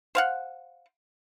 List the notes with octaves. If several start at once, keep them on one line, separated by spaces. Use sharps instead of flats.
C5 F5 F#5